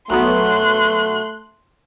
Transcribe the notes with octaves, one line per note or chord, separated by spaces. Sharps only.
B1 F#3 A3 B3 C6 F#6